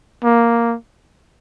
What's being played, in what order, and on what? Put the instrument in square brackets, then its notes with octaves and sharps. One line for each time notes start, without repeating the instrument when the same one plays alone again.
[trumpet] A#3